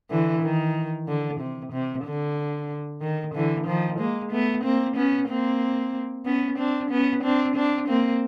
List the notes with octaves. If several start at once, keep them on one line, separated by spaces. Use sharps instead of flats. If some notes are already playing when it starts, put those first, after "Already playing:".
D3 E3
D#3
D3
C3
C3
D3
D#3
D3 E3
D#3 F3
G#3 A#3
A3 B3
A#3 C4
B3 C#4
A#3 C4
B3 C#4
C4 D4
B3 C#4
C4 D4
C4 D4
A#3 C4